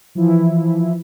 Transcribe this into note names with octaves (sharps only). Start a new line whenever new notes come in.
E3 F3 E4